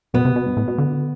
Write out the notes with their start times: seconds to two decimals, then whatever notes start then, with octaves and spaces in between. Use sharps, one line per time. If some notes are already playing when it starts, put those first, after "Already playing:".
0.14 B2 B3
0.25 C3
0.36 B2
0.46 G2
0.57 A2
0.68 B2
0.78 D3